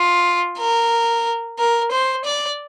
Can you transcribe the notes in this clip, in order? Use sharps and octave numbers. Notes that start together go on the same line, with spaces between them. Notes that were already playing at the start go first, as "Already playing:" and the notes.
Already playing: F4
A#4
A#4
C5
D5